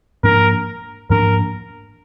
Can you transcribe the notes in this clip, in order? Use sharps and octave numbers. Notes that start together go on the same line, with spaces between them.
G#2 F3 A#3 D4 A#4
G#2 F3 A#3 D4 A#4